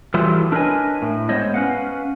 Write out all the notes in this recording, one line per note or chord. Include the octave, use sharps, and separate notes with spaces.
E3 F#3 G3 A3 E4 F4
D4 A#4 B4 C#5 D#5 G#5
A2
G#3 B3 C5 C#5 D#5
C#4 B4 F5 F#5